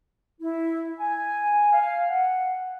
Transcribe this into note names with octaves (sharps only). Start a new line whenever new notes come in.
E4
G#5
F5
F#5